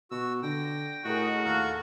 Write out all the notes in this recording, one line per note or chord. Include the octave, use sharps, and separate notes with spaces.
B2 F#4 E6
D3 G5 A#6
A2 F#4 G#4 A#4 D#5
D#2 A4 F5 A5 A#5 C#6